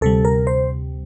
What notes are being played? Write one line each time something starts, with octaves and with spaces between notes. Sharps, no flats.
D2 C3 G3 A4
A#4
C5